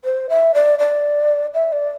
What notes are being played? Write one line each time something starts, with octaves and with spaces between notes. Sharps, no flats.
C5
E5
D5
D5
E5
D5